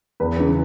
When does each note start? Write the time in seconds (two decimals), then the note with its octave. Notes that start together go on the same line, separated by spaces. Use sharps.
0.20 E2 B4
0.38 C#3 E3